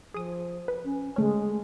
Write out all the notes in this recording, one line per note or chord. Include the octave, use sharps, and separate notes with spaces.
F3 G#4 D#6
B4
C#4
D3 G#3 A3 C#4